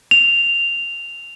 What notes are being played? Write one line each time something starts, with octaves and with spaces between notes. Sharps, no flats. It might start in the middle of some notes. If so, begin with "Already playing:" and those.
F7